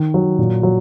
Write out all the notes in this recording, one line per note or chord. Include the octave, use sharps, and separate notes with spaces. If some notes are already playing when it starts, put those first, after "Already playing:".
Already playing: D#3
F#3
A#2
F#3